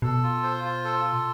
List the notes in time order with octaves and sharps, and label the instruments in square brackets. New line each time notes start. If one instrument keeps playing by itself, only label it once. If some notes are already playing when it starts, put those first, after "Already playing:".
[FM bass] B2 [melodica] A4
[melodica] F4
C5
F4
A4
F4